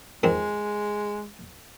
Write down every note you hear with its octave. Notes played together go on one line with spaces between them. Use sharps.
F2 D#3 G#3 C4